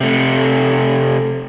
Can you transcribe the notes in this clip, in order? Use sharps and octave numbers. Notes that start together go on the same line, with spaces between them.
C3 A3